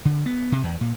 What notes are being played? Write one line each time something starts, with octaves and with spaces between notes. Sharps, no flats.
D3
B3
C3
E2
A#2